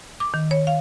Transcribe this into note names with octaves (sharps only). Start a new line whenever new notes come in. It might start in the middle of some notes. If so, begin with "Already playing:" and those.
D6
D#3
C#5
F5